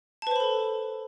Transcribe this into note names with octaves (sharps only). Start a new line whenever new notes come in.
A4 B4 C5 A5 B5